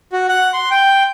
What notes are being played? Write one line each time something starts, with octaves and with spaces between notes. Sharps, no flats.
F#4
F#5
C6
G5